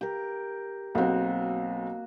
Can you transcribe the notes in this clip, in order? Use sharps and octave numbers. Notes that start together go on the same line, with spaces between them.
G4 A#4
B1 A#3 C4 F#4